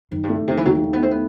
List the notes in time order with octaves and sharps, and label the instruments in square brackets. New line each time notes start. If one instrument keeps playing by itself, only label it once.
[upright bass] F#2 [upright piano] D#3
[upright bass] G2
[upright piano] A3
[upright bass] A2
[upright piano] D#2 [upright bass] C3
[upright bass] E3
[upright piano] D#2 [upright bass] F#3
[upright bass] G3
[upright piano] D#3 [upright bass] A3
[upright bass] B3
[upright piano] A3 [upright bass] C4
[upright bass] B3